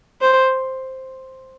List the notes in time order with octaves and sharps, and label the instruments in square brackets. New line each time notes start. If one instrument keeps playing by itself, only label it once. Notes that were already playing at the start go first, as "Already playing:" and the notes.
[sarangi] C5